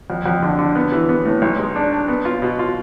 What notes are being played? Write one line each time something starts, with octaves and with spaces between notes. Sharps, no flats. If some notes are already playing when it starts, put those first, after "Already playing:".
F2
F2
D3
D3
B3
E3
B3
A2
B1
G#3
D4
D4
B3
F4
B2
F4